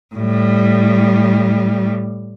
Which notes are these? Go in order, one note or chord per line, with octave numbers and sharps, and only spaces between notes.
A2 G3